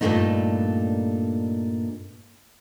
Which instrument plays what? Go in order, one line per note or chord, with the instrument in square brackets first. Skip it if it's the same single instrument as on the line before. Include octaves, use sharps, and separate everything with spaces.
[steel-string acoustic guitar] G2 A#2 D3 A3 D4 D#4